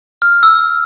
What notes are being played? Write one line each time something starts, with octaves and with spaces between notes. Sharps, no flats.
F6
E6